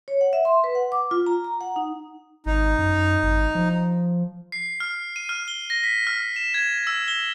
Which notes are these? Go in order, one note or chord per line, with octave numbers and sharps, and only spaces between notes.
C#5
F#5
E5
C6
B4
F#5
D6
F4
A#5
A#5
F#5
D#4
G#1 D#4
F#2
G#1
F3
C7
F6
D#7
F6
G7
A#6
B6
F6
E7
G#6
E6
G7